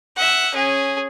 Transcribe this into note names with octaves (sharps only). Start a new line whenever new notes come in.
E5 F#5
C#4 G#4